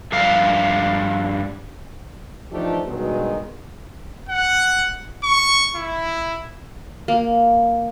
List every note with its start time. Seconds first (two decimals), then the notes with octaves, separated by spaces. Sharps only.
0.12 G2 F3 D4 A4 F5
2.52 E3 F3 A3 D4 D#4 G4
2.86 G2 B2 D#3 F#3 G#3
4.29 F#5
5.23 C#6
5.76 E4
7.08 A#3